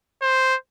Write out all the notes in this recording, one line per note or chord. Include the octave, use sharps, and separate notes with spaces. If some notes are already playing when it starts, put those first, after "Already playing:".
C5